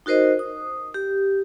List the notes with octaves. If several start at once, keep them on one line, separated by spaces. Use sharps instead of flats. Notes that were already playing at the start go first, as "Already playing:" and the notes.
D#4 F#4 A#4 C5 D#5
D#6
G4